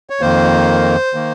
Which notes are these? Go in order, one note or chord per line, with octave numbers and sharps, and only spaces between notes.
C#5
F2 D#3 A#3 C5
D#3 A#3